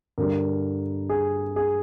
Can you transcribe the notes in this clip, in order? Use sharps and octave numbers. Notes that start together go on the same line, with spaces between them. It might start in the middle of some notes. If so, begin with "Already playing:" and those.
G2 D3 G3 A#4
G#4
G#4